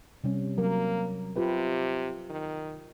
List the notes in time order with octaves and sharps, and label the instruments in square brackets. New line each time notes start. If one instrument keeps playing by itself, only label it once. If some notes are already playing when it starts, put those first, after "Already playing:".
[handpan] C3 G3 C#4
[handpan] F#3 A#4 [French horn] A#3
[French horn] C3 [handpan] F4 G4 B4
[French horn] D#3